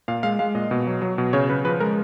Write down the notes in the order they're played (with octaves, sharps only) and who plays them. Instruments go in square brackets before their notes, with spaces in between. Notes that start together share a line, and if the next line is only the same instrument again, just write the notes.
[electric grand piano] A#2 F5
G#3 F5
G#3 F5
A#2 D#5
B2
F#3
F#3
B2
C#3 C#5
C#3 B4
F3 B4
G#3 A#4